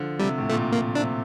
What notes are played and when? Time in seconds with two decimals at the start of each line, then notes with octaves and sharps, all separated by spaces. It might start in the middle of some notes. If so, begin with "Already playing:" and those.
Already playing: D3 F3
0.19 C3 G3
0.38 A2
0.49 A#2 A3
0.72 A#3
0.95 C3 D4